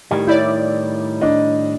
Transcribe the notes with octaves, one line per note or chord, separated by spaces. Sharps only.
A2 D#3 G3 G4
E4 C#5 D5 G6
D4 D#5